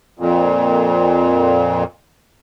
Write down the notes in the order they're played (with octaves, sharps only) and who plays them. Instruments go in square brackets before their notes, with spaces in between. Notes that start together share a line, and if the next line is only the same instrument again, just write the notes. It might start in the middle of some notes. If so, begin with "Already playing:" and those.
[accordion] F2 A#2